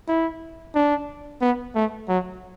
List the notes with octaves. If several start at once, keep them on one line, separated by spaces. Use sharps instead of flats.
E4
D4
B3
A3
F#3